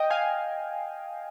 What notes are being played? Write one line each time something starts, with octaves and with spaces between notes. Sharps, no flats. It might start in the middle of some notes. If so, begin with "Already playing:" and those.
Already playing: D#5 G5
F5 G#5